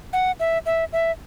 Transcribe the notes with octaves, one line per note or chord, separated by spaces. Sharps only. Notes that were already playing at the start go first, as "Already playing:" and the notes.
F#5
E5
E5
E5